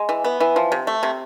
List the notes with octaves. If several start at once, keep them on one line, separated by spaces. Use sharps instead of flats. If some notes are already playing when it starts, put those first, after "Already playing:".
Already playing: G#3
E3
B3
E3
F3
C3
A3
C3